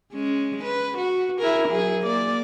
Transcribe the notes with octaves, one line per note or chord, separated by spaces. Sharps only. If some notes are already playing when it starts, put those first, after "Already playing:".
G#3 C#4
B4
F#4
E4 G#4 A#4
F#3 G#4
A#3 D5